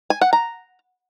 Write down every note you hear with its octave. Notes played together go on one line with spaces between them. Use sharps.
G#5
F#5
A#5